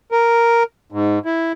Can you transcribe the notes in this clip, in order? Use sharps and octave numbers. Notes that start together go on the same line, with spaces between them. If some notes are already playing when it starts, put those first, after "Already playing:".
A#4
G#2
E4